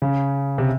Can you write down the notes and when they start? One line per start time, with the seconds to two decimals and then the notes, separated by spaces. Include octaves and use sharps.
0.02 C#3
0.58 C3